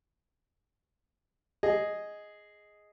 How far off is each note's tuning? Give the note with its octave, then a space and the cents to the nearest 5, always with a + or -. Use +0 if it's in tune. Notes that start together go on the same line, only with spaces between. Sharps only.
G#4 +0 D#5 +0